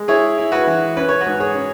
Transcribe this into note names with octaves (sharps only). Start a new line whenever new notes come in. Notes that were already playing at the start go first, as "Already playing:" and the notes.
Already playing: G#3
E4 G#4 C#5
E4
F#4 B4
E3
C#4 B4
C#5
F#4 B4
G#2
G#4 C#5
C#4